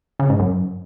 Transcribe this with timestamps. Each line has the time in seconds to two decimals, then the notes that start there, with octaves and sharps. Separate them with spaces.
0.19 C#3
0.29 G#2
0.40 F#2